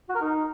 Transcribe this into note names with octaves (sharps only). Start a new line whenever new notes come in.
F#4
A#4
D#4